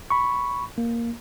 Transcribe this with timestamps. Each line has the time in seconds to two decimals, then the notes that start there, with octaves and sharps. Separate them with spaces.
0.10 B5 C#6
0.78 A#3